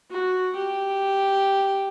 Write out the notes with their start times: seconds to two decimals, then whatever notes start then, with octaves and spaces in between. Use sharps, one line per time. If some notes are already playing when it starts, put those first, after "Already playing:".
0.11 F#4
0.55 G4